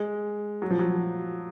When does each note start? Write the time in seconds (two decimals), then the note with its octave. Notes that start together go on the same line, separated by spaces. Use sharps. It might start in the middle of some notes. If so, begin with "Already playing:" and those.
Already playing: G#3
0.62 F#3
0.70 F3
0.79 F#3